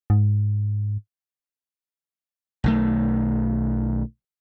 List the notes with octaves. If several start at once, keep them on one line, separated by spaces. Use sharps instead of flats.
G#2
B1 D#3 A3